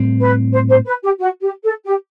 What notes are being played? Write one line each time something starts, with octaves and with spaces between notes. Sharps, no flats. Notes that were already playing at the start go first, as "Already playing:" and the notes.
Already playing: A2 G3 C4
B4
C5
C5
B4
G4
F#4
G4
A4
G4